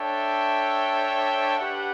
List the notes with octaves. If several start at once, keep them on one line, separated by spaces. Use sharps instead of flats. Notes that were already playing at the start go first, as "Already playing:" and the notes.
Already playing: D4 A4 C#5 E5 G5
D4 G4 B4 F#5